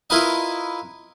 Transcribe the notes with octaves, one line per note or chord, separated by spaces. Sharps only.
E4 F4 A#4 B4 D#5